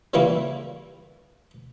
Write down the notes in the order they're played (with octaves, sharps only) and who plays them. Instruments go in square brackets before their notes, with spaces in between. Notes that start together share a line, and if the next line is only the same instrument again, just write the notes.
[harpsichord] C#3 E3 G3 A#3 E4 F#4